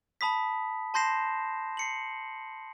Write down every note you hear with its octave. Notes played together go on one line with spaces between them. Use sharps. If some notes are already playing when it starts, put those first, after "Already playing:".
A5 B5 D#6 B6
A5 C6 G6 A#6 C7 E7
C7 C#7 F#7